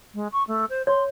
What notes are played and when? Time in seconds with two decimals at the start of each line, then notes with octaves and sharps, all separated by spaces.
0.14 G#3
0.32 C#6
0.48 A3
0.69 C5
0.87 C#5 C6